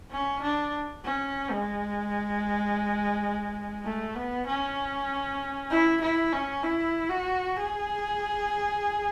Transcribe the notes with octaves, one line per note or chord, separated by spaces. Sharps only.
C#4
D4
C#4
G#3
A3
B3
C#4
E4
E4
C#4
E4
F#4
G#4